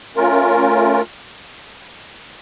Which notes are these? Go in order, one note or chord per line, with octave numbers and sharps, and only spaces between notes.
A3 C#4 F4 A#4